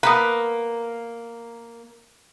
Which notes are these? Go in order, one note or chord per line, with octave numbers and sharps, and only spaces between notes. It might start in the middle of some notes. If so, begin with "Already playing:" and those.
A#3 B3 B4